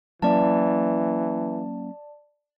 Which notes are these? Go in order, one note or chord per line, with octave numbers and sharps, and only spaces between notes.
E3 F#3 A#3 C#4 D5 A5